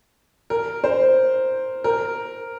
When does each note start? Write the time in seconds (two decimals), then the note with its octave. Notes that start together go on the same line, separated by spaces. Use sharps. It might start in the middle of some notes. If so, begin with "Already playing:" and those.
0.50 A#4
0.84 C5
1.84 A#4